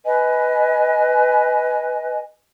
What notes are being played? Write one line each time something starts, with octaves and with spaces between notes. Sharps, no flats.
B4 D#5 G#5